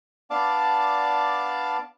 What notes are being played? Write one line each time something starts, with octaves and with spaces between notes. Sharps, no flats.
B3 D4 D5 F5 A5 D6